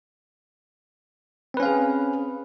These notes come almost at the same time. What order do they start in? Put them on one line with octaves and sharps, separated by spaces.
C4 B4 C#4 F5 G#4